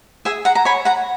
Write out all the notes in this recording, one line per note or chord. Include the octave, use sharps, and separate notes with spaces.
G#4 E5 G#5
F#5 A#5
A#5
C#5 G#5 B5
F#5 A#5